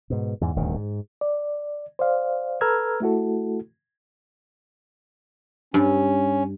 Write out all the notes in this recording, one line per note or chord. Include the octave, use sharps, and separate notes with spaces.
G#2 B2
E2 G#2
D#1 D2 G#2 D#3
G#2
D5
C5 D5 F5
A4 B4 A#5 E6 F6 G#6
A3 E4 F#4 A4
G2 C#4